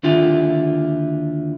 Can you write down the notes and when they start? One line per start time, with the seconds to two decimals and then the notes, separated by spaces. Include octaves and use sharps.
0.03 D#2 D3 E4 F4 G4